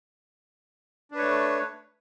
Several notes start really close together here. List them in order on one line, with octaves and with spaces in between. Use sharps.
D4 B4 C#5 A3